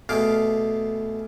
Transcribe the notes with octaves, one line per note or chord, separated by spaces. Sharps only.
B2 A3 G#4 F5 D6